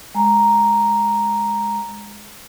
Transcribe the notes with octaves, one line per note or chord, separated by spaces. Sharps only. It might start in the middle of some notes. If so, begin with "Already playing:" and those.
G#3 A#5